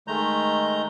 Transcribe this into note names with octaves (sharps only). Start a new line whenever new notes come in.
D#3 G#3 A3 A#5 G6